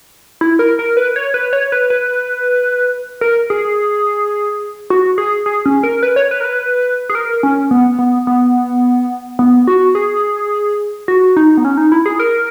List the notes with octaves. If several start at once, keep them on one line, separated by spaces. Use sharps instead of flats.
E4
A#4
A#4
B4
C#5
B4
C#5
B4
B4
A#4
G#4
F#4
G#4
G#4
C#4
A#4
B4
C#5
B4
A#4
B4
G#4
A#4
C#4
B3
B3
B3
B3
F#4
G#4
F#4
D#4
B3
C#4
D#4
E4
G#4
A#4